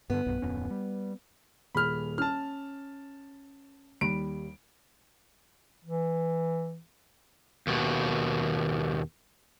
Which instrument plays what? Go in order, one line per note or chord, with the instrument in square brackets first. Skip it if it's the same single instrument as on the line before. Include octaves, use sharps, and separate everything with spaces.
[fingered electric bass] G2 D3 [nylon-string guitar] B3
[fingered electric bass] B1 G2
D1 F2 C#4
G3
[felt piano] D#1 G#4 [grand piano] B5 F6
[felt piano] C#4 [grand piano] A5 F6
[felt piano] D#2 G3 B5 [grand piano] D7
[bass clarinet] E3
[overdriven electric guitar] D#2 B2